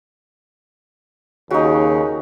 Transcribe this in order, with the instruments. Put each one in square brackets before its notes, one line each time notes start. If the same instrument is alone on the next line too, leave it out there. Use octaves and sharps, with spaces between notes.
[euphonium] D#2 [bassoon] C#3 [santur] D#4 F#4